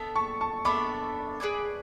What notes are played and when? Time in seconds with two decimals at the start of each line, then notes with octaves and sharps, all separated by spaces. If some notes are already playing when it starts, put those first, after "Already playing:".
Already playing: B3 D4 A4 E5
0.16 A5 C#6
0.41 A5 C#6
0.65 B3 D4 A4 E5 B5 D6
1.40 G#4 B4 D5 G#5